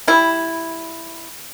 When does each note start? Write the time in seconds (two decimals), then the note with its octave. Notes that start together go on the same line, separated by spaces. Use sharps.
0.08 G3 E4